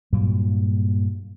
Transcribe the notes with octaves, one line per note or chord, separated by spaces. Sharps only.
G2 A#2 F#3 A#3